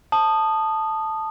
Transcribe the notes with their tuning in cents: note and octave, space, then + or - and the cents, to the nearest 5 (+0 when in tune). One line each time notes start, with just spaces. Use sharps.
A5 +0 D#6 -15